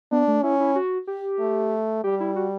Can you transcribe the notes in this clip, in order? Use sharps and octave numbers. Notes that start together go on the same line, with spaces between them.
B3 D4
A3
C#4 E4
E4
F#4
G4
A3
G3 G4
E4
F#4